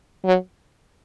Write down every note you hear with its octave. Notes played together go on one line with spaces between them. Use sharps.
F#3